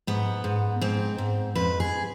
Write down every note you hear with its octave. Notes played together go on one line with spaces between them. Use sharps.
G#2 B3
G#2
G#2 C4
G#2
F2 B4
G#4